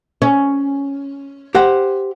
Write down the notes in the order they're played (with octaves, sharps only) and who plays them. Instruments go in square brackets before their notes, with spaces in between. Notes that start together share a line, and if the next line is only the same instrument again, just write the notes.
[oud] C#4
[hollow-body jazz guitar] G4 C5 F#5